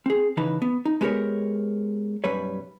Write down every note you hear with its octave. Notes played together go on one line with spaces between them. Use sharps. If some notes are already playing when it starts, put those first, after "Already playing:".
C4 G#4
C#3 E3 D#4 B4 A5
B3
D#4
G#3 B3 G4 A4 A#4 C#5
B1 F#2 G3 B4 C#5